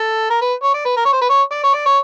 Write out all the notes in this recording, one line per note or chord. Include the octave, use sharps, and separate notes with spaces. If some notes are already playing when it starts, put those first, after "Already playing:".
Already playing: A4
A#4
B4
C#5
D5
B4
A#4
C#5
C5
B4
C#5
D5
C#5
D5
C#5